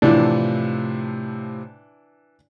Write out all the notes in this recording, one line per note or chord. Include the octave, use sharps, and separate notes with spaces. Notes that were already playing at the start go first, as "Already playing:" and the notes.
A2 C3 E3 F3 D4